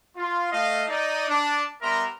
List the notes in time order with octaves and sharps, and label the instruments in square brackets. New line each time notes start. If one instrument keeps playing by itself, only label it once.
[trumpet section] F4
A3 D#5 F5
D#4 D5
D4
G3 B3 A#4 E5 A#5 C6